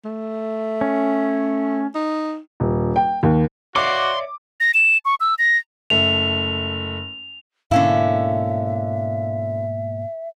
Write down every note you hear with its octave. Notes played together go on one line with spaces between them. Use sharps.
A3
C#4
D#4
D#1
G5
D#2
F#4 C#5 D5 E5 C6 D6
A#6
E7
C#6
E6
A#6
F#1 A3 F7
G#2 B2 D3 A#3 C#4 E4 E5 F5